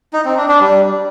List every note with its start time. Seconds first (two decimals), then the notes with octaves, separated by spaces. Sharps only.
0.13 D#4
0.25 C4
0.37 D4
0.49 D4
0.60 G3